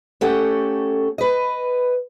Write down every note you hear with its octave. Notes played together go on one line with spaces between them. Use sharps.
A3 C#4 G4 A4 F#5
B4 D#5